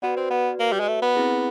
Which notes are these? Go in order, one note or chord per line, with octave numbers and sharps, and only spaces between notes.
B3 F#4 B4 D5
C4
B3
A#3
G3
G#3
A3
B3
C4 E4 G#4